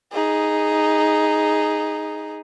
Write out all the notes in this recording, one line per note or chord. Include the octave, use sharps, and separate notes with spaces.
D#4 G#4